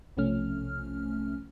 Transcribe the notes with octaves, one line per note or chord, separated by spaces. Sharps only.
B1 C3 F3 A3 C#4 F6